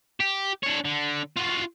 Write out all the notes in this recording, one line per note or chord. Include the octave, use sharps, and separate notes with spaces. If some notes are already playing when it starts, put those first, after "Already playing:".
G4
D4 C#5
D3
F4 F#4